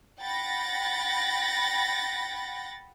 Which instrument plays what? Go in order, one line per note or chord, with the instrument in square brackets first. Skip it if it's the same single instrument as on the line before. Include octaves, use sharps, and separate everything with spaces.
[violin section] F#5 G5 B5 A6 A#6